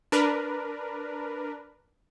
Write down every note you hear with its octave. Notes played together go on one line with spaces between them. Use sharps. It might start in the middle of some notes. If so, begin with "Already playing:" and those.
D4 A#4 B4